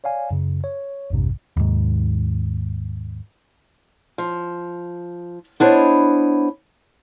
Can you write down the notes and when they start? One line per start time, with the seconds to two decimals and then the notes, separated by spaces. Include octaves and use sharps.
0.04 C#5 D5 F5 G#5
0.31 F#2 C#3
0.64 C#5
1.10 A#1 E2 G2 C3
1.57 D#2 G#2
4.18 F3
5.60 B3 D4 E4 C5 C#5 D#5